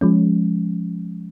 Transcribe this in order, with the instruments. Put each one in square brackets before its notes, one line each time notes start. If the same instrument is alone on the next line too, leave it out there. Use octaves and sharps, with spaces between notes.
[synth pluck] F3 G#3 C#4